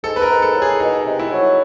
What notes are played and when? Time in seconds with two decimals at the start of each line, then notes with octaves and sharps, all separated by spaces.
0.03 G#2 A4
0.16 B4
0.22 A#4
0.29 G#2
0.42 A4
0.55 A2
0.62 G#4
0.80 B2 D#4
1.06 C3
1.19 E4
1.32 F#3